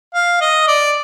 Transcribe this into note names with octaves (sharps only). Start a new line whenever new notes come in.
F5
D#5
D5